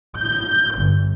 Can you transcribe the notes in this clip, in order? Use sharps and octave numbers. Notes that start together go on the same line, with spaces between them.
G6
G1